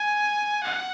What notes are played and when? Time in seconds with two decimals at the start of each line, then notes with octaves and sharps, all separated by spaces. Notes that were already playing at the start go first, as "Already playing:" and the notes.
Already playing: G#5
0.63 F#5